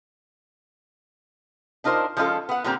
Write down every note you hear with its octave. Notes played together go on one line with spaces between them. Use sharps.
D4 D#4 F4 A#4 C5
F3 G#3 C#4 E4 F4 A4
B3 F#5
A#2 D3 G3 A#3 C4 A#5